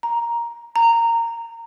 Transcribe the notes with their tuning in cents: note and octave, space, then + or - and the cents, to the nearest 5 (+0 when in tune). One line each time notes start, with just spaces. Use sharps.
A#5 +5
A#5 -15